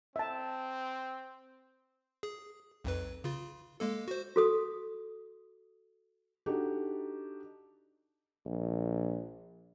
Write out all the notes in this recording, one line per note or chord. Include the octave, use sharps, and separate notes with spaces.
C4 E5 A5
G#4
B1 F2 B4
C#3 F4
G#3 A#3 A4
F#4 C5
F#4 A4 D#6
D4 D#4 F#4 G4 A4
A#1